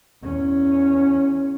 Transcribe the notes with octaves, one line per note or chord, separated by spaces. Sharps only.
E2 C#4